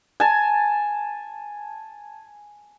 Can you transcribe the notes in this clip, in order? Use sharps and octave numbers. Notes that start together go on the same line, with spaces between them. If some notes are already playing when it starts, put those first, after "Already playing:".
G#5 A5